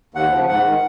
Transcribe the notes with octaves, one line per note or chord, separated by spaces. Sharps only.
D#2 F#5
C#3 F3
G#2 F#5
D#3